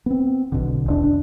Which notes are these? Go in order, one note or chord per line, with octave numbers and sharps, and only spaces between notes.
B3 C4
B1 B2 D3
E1 D4
D4